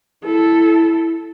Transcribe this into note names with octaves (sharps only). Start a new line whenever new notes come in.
E4 A4